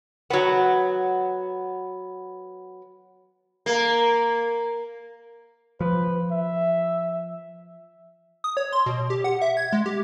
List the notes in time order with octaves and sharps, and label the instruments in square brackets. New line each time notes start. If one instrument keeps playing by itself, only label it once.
[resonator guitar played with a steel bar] F#3 B3
[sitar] A#3
[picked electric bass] F3 [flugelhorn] B4
[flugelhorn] E5
[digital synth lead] D#6
C#5
C6
B2
G4
F#5
E5
G#6
G#3
G4